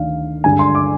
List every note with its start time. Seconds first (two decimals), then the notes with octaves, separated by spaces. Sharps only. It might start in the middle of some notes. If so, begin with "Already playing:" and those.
Already playing: D2 D#3 F5
0.44 G2 D3 G#3 G#5
0.59 C6
0.75 D6